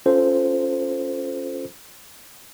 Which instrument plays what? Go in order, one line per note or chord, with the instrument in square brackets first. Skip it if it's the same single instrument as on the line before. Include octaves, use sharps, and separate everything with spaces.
[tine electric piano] C#4 F4 A4 C5